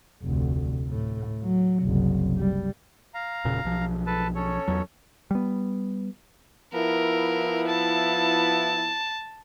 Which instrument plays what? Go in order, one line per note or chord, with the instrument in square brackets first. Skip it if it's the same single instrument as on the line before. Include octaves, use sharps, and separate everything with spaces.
[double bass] F1 D2
A2
F#3
F#1 C2
G3
[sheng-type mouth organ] F5 A#5
[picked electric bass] E1 A#2 C#3
B1 F3
[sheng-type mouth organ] A4 B4 A5
C#4 A4 C#5
[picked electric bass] E2 F#3
G3 B3
[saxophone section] F3 B3 E4 [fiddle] A#4
[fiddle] A5